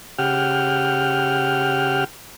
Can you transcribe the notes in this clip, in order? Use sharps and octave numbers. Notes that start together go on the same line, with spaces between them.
C#3 G4 F#5 G5 F6